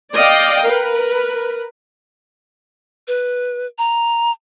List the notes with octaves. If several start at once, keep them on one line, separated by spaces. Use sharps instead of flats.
D5 D#5 F5 G5
A#4 B4
B4
A#5